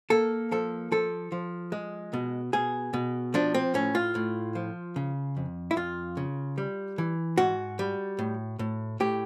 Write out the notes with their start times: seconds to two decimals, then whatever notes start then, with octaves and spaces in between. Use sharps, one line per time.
0.10 A#3 A4
0.51 F3 A4
0.92 F3 A4
1.32 F3
1.72 G#3
2.13 B2
2.53 B2 G#4
2.94 B2
3.34 F3 D4
3.54 C4
3.74 A2 C#4
3.95 F4
4.15 A2
4.55 F3
4.96 C#3
5.37 F2
5.71 E4
5.76 F2 F4
6.17 C#3
6.58 G3
6.98 E3
7.38 G#2 F#4
7.79 G3
8.19 A2
8.59 A2
9.00 A2 G4